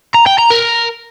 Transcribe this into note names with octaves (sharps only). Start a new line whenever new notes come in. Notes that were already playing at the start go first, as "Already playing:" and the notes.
A#5
G5
A#5
A#4